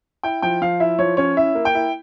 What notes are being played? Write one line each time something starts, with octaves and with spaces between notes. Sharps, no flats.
E4 G5
F3 G5
F3 F5
E4 E5
F3 C#5
C#4 C#5
E4 E5
A#3
G5
E4